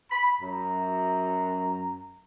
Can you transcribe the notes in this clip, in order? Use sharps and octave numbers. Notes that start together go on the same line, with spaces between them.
B5
F#2 A#5